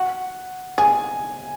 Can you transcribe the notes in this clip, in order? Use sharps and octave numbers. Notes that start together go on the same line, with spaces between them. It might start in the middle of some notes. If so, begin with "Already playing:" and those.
Already playing: F#4 F#5
G#4 G#5